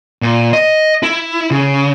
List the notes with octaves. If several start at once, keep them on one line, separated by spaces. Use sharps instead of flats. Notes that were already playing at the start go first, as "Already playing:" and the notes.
A#2
D#5
E4
C#3